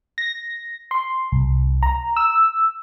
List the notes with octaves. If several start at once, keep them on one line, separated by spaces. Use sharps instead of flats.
A#6
C6
C2
A#5
E6